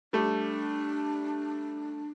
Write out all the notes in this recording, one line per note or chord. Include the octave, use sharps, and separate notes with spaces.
G3 A3 D4